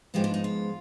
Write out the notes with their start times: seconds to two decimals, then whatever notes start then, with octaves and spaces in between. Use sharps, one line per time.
0.14 G#2 F3 G#3 B3 G4
0.24 D4
0.34 D#4
0.44 F4